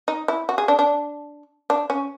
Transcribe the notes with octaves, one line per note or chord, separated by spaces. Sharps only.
D#4
E4
F#4
G#4
D4
D4
D4
C#4